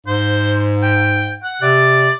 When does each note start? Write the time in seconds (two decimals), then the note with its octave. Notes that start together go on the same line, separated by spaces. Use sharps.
0.07 G#2 C5
0.82 G5
1.43 F#5
1.62 C3 D5